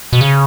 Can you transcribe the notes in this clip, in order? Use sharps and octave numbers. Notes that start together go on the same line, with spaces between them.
B2
C#3